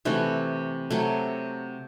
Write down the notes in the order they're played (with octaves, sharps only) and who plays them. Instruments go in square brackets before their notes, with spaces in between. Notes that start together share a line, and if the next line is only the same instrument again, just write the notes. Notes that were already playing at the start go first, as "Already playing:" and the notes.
[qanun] C3 E3 A3 F#4
C3 F#3 A3